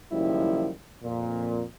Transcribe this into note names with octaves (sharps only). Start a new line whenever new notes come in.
F#1 F#2 D#3 F3 G3 E4
F2 A#2